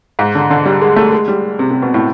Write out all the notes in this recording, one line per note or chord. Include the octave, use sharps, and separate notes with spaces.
G#2
D3
D3
G3
G#3
A3
G#3
G3
C3
C3
B2
A2